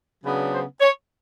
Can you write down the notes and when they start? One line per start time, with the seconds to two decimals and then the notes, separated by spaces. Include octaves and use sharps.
0.24 C#3 F#3 B3 D4 B4
0.52 C5
0.81 C#5